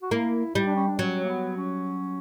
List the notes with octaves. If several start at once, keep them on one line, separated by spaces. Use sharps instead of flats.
F#4
A#3 E4
G3 E4
D4
C#4
D4
F#3 C#4
A#3
B3
C#4